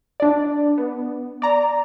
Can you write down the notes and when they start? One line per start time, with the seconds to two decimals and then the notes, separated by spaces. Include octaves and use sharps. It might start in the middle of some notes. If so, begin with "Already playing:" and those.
0.20 D4 D5
0.78 B3
1.42 D5 A#5